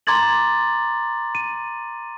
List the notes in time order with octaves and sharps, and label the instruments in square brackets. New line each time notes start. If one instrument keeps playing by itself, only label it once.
[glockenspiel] A#5 C6 D6 G#6 A6 F#7
D#7